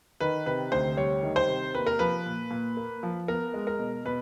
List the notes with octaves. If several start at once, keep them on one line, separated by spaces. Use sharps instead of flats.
D#3 B4
C3 B4
D2 C5
G3 C#5
D#3
C5
C3
A#3 B4
A#4
F3 B4
A#2
A#2
A#3
F3
B3 A#4
G#3
A#4
B2
B2 B4